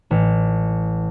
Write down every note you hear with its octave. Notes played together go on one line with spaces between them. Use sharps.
A1